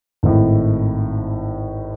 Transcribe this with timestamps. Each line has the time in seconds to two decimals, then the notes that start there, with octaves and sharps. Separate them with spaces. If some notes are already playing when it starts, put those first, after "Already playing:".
0.23 G#1 A2